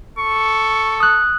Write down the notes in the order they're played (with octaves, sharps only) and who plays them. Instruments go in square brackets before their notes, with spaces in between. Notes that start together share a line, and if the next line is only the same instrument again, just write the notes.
[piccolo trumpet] A4 [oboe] C#6
[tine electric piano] D#6 F#6